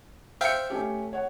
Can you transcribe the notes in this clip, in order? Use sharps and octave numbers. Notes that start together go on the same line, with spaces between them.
C5 E5 F5 G5 C#7
A3 C#4 G4
C#5 F#5